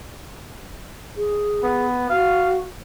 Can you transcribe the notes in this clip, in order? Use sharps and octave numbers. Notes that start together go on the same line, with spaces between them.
G#4
B3
F#4 F5